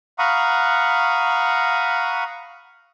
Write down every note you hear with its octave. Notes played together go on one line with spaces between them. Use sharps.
F5 F#5 A#5 B5 C#6 D#6